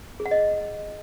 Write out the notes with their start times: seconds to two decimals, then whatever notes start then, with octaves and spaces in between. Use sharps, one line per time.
0.20 G#4
0.26 F#5
0.31 D#5